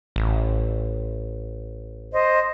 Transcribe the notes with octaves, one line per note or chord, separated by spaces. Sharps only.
A1
C5 D#5